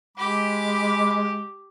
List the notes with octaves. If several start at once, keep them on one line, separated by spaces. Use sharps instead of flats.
G#3 G4 B5 D6